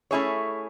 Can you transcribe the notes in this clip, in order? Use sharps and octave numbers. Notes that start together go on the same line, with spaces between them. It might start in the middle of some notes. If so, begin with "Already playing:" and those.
A3 C#4 E4 G#4 C#5